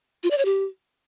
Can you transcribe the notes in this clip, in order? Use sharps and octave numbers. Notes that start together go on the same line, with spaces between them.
F4
D5
C#5
G4